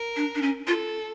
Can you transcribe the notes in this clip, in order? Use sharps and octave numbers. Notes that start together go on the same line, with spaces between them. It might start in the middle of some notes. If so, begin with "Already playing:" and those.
Already playing: A#4
D4
D4
C#4
F4 A4